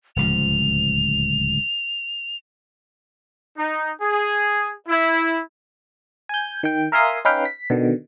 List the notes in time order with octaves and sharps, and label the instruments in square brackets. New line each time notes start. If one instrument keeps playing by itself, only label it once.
[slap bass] D1 C#2 F3 [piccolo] F7
[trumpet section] D#4
G#4
E4
[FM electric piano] G#5 G6
D#3 G5
A#4 E5 F5 G#5 C6 D#6
C#4 D#4 B4 F5 G5
B6
B2 D3 D#3